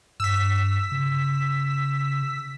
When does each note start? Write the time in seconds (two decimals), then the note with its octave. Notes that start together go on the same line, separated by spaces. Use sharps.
0.20 G2 E6 B6
0.92 C#3